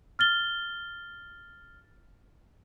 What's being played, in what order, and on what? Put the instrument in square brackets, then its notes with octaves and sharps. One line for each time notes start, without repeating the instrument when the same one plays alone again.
[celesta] F6 A6 G7